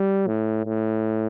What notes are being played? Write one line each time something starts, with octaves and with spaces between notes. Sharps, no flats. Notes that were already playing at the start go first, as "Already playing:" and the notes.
Already playing: G3
A2
A2